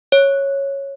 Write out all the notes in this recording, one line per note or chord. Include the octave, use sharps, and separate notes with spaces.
C#5